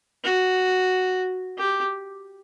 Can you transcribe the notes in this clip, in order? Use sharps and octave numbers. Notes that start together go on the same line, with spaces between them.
F#4
G4